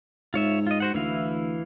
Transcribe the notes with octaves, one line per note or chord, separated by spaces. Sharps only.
G#2 F4 C#5 E5
F4 D#5
F#4 C5 F#5
D2 E3 E4 F5